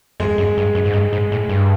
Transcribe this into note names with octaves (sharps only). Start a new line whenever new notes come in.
F2 G#3
F#2
G2
F#2
G#2
G2
G#2
A2
G2